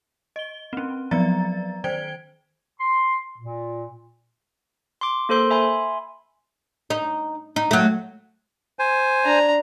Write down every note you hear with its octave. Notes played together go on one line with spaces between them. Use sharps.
D#5 G7
C4 C#4
F3 F#3 B3 D5 A#5 A6
D#3 C5 G5 G#6 D7 G7
C6
A#2
C6 D6
A#3 A4 C5 C6
E5 G#5 B5 C6
D#4
D#4
F#3 A3
C5 G#5
D4 A#5